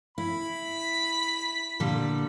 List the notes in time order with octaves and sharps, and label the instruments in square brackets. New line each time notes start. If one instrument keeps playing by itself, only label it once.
[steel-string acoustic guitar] E4 [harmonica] B5
[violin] B6
[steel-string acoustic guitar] A#2 D3 G3